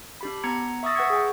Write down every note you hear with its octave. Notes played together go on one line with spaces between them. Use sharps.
D4 G4 B5
B3 A#5 G#6 C#7
E5 C#6 D#6 E6 A6 A#6
B4 F#5 C#6 G#6 C#7
G#4 G5